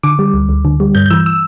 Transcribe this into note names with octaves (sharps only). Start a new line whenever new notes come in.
D3 D6
G3
D2
D2
D3
G3
G2 G6
G6
E3 E6
E6